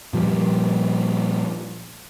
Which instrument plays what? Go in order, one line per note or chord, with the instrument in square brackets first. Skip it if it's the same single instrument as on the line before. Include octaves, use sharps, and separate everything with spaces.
[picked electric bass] A#2 F3 G3